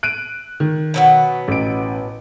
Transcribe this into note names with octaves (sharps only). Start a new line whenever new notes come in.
F#6 D7 D#7
D#3
B2 F#3 B3
A1 D7